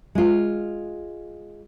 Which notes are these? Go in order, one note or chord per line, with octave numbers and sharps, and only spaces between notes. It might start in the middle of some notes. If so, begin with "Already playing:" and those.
G#3 F4